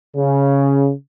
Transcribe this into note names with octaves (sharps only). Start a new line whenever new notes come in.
C#3